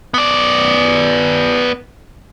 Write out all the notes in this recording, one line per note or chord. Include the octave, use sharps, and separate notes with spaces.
B3 D5